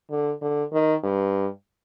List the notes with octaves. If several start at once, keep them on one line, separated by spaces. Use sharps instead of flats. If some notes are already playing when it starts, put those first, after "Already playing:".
D3
D3
D#3
G2